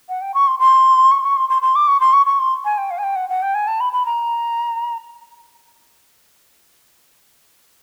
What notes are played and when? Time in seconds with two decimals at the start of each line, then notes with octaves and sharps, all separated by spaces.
0.09 F#5
0.22 G5
0.34 C#6
0.48 C6
0.60 C6
1.12 C#6
1.24 C#6
1.37 C6
1.50 C6
1.62 C6
1.76 D6
1.88 C#6
2.00 C6
2.13 C#6
2.26 C#6
2.39 C6
2.65 G#5
2.78 G5
2.91 F5
2.98 G#5
3.03 G5
3.16 F#5
3.29 F#5
3.42 G5
3.55 G#5
3.67 A5
3.80 B5
3.93 B5
4.06 A#5